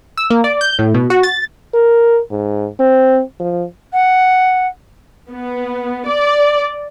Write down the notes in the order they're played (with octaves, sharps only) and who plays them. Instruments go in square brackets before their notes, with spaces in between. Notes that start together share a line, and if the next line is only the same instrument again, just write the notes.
[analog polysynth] E6
A#3
D5
G6
A2
B2
F#4
A6
[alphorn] A#4
G#2
C4
F3
[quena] F#5
[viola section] B3
D5